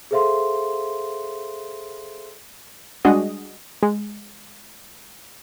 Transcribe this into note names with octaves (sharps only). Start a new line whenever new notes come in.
G#4 A4 C5 E5 F5 C6
G3 G#3 D4 F#4 G#4 D#5
G#3